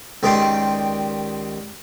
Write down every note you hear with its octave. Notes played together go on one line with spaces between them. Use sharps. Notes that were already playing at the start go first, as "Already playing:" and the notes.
C#2 D#3 G4 D5 C6